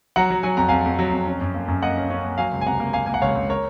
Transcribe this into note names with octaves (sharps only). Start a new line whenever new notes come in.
F#3 F#5 A#5
F#3
F#3 G#5
F2 A#5
F2 F5 G#5
F2
F#3
F2
C#4
F#2
A#3
F#2
A#3 D#5 F#5
C#4
C#4
A#3
F#3 F5 G#5
C#2
G#5
C3 F#5 A#5
A#3
A#3 F5 G#5
A#3 G#5
F#5
C#2 C#5 F5
C#2
A#4 C#5